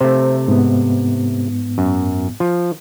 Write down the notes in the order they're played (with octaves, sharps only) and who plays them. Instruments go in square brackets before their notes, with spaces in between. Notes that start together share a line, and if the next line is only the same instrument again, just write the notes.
[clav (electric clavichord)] C3 A3 [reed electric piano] C5
[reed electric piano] G#2 B3
[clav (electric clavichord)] F#2
F3